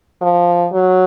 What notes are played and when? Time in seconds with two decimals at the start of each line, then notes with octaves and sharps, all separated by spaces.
0.22 F3
0.72 F#3